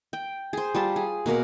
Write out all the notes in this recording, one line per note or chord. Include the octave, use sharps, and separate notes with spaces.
G5
G#4 C5
G3 F4 A5
G#4
B2 A#3 A#4 F#5